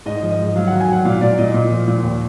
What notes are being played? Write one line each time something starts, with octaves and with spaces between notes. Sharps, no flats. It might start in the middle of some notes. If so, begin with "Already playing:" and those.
G#2 D#5
F3
D#5
G#2
F#3 F5
D#3 F#5
G#5
F#3 F#5
A#2 F5
A#2 D5
A#2 D#5
A#2
F3
A#2
D#2